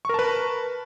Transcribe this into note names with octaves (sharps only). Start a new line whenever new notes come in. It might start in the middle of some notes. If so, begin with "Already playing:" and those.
A#4 B4 A5 C#6